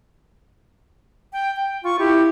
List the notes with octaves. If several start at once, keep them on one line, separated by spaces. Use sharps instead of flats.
G5
G5
F4 C#6
E4 G4